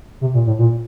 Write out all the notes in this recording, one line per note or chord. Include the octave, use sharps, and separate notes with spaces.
C3
A#2
A2
A#2